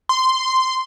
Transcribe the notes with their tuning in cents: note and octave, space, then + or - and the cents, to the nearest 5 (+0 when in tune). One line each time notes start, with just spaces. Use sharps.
C6 -10